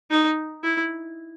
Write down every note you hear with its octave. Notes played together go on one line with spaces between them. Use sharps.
D#4
E4